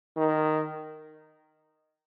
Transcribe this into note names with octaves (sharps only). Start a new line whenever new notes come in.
D#3